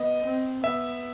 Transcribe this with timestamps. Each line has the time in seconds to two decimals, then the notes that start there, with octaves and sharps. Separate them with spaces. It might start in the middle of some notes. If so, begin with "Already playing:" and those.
Already playing: B3 D#5
0.25 C4
0.64 B3 E5